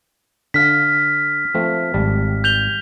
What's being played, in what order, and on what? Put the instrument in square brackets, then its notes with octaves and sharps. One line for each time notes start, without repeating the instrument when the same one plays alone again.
[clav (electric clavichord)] D3 F5 [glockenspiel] F6 B6
[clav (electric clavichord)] F3 A3 C4
G#1 G3 A5
[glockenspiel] G6 F7 G7